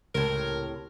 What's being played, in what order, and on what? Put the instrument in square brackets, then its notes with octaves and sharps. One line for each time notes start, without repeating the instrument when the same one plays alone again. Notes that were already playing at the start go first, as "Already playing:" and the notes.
[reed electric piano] C#2 [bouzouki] A2 C3 [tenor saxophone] A#4